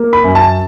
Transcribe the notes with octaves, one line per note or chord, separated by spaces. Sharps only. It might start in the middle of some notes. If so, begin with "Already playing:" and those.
Already playing: A#3
B5
F#2
A5